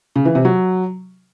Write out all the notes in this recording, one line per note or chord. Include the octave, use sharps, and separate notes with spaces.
C#3
E3
C3
F#3